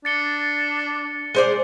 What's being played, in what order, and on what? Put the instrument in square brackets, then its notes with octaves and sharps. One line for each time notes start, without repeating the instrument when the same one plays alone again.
[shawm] D4 [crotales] A6 C#7 G7
[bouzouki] G#3 C5 D5